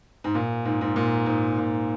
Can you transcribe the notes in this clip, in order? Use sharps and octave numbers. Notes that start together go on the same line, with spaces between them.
G#2
A#2
G#2
G#2
A#2
G#2
A#2